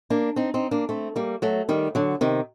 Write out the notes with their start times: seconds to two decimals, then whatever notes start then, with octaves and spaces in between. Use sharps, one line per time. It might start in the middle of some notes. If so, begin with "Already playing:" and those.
0.10 A#3 D4
0.36 C4 D#4
0.54 C4 D#4
0.71 A#3 D4
0.89 A3 C4
1.16 G3 A#3
1.42 F#3 A3
1.69 D#3 G3
1.95 D3 F#3
2.21 C3 D#3